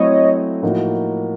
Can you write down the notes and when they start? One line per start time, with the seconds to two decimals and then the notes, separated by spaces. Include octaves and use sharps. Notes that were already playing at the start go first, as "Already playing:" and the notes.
Already playing: F#3 A3 C4 E4 A4 C#5 D#5
0.63 A2 F3 A#3 D#4 F#4